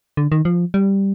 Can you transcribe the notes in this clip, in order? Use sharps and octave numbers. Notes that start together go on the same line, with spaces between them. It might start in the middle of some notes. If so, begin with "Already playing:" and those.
D3
D#3
F3
G3